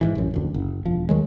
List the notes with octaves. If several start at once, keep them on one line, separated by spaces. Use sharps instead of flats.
G#2 B2 E3
A1 F#2
F1 D2
F#1
E1 F3
D#2 D#3 F#3 G#3